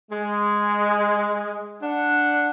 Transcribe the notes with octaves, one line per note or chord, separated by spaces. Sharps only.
G#3
D4 F#5